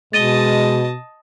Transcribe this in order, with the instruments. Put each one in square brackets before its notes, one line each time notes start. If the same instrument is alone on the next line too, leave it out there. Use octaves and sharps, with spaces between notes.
[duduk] B2 [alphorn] G#3 [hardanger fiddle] D#5 A5 [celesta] A6 D#7 G7